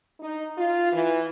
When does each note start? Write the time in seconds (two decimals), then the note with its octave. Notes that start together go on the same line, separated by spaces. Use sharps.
0.20 D#4
0.58 F4
0.93 E3